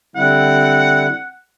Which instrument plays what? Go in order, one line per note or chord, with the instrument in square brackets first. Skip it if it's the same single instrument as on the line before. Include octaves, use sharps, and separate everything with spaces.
[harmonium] D3 G3 E4 [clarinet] C4 [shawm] F#5